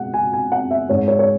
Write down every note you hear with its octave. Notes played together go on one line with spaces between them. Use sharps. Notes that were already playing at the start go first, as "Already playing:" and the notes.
Already playing: B2 G#3 F#5
G#5
G#5
F#5
E5
G#2 G#3 C#5
C#5
C#5